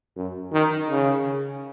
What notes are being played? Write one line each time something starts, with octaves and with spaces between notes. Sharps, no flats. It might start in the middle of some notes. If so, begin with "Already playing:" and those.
F#2
D#3
C#3